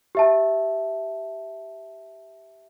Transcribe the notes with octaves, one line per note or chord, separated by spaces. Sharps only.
G4 E5 A5